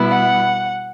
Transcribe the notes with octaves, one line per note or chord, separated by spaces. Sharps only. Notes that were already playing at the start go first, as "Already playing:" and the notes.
Already playing: B2 G3 B3 E4
F#5